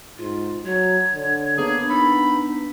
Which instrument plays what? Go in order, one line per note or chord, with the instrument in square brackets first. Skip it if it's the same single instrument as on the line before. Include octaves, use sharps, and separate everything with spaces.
[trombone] G#2 [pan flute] F4
[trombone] F#3 [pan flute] C#5
[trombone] D3
[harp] A#3 D4 [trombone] B3 [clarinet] G#4
[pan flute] D#4 [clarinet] B5 [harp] E6 A6
[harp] B6